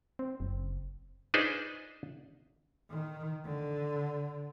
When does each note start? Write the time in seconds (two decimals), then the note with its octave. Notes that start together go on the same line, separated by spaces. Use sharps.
0.19 C4
0.40 F#1
1.34 D4 D#4 F4 G#4 B4 C5
2.90 D#3
3.44 D3